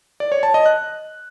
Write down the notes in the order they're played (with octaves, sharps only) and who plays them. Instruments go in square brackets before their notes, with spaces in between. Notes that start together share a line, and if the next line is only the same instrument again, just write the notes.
[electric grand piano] D5
C#5
A5
D#5
F#6